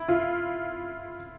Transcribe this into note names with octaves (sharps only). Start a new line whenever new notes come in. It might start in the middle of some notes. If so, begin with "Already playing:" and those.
Already playing: E4
F4